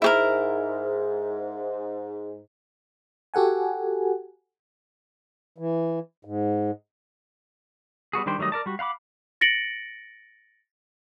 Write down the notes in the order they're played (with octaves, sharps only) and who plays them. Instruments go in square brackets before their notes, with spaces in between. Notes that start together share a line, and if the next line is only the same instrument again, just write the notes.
[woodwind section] G#2 [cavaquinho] E4 G4 A#4
[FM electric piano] F#4 G4 A4 F#5 G#5
[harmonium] E3
G#2
[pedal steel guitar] G3 B3 F#4 G#4
D#3 G3 D4 C5 G5
D#3 F#3 G3 A3 D#5
A#4 D5 A5
G3 F#4
F5 F#5 B5 D6
[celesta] A6 A#6 C#7 D7 F#7